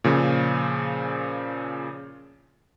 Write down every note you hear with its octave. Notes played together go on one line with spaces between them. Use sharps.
A#2 C#3 F3